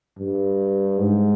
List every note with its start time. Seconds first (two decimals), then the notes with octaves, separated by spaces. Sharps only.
0.19 G2
0.98 G#2